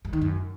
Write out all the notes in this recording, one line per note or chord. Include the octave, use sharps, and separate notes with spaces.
G2
D#3
F#2